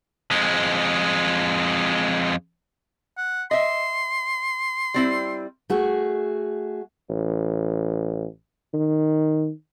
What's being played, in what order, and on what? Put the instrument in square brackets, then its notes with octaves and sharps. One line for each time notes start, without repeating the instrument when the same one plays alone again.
[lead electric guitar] F2 G#3
[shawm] F#5
[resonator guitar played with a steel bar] D#5 E5 [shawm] C6
[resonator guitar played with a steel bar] G3 C4 E4
[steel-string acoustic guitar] A3 F#4 G#4
[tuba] A1
D#3